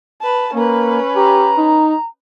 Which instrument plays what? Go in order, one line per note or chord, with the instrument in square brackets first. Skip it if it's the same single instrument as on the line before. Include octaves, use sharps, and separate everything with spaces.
[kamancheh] B4 A5
[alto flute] A#3 [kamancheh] C#4 B4
[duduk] G4 [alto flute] A#5
[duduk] D#4